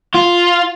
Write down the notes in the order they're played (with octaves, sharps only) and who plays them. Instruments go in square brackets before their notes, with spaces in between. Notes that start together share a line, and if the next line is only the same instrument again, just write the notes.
[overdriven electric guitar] F4